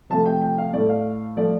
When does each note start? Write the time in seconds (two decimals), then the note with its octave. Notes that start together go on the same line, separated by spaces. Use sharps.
0.10 C3 F3 A3 A5
0.26 G5
0.41 G5
0.58 F5
0.73 A2 A3 D5
0.89 F5
1.37 F3 A3 D5